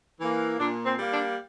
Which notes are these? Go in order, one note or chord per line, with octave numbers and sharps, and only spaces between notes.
E3 A#3
A#2 D4
C4
G3 A#3
D4